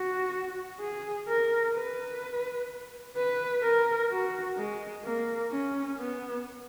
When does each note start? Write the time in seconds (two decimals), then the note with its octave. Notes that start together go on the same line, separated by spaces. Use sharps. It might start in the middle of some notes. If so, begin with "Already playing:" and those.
Already playing: F#4
0.80 G#4
1.27 A#4
1.75 B4
3.16 B4
3.63 A#4
4.10 F#4
4.57 G#3
5.04 A#3
5.51 C#4
5.98 B3